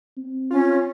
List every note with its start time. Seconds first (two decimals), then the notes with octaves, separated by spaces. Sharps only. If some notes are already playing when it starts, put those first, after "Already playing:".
0.17 C4
0.51 C#4 F4